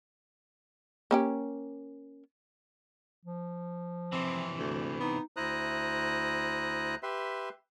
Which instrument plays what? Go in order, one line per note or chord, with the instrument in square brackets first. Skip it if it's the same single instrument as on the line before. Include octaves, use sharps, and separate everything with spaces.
[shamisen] A#3 C#4 G4
[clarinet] F3
[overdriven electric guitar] C3 E3 [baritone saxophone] C4
[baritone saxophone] D2
[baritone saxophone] B3 [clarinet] D#4
[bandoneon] D2 E4 C5 A#5 D#6 F#6
G4 B4 E5 C6